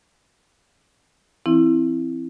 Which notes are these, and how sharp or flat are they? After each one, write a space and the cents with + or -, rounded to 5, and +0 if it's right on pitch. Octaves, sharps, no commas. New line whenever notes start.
E3 +15 C4 +0 E4 +0